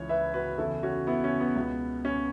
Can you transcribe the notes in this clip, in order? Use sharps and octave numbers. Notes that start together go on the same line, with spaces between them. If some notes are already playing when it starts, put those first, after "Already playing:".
Already playing: C#2 C#3 E3 C#5
B4 E5
F#4 B4
E2 C#3 E3 E4 A4
C#4 F#4
B3 E4
C#4
B3
C#2 B2
C#4